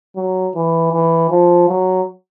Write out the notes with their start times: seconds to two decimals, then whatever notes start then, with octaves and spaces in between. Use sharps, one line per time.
0.16 F#3
0.55 E3
0.92 E3
1.30 F3
1.69 F#3